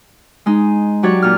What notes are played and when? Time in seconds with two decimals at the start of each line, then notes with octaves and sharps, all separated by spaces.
0.46 G#3 D#4
1.03 F#3 F#4 G4 C#5 D5
1.22 A#2 F6